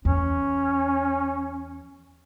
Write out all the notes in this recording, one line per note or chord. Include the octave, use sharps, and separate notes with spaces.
E2 C#4